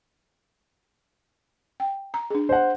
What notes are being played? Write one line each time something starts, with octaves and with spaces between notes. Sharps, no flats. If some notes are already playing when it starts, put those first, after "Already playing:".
G5
A#5
D4 G#4
C5 F#5